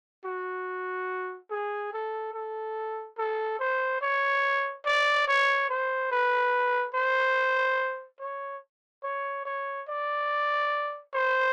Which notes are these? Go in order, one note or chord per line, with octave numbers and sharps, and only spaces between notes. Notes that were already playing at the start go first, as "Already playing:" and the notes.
F#4
G#4
A4
A4
A4
C5
C#5
D5
C#5
C5
B4
C5
C#5
C#5
C#5
D5
C5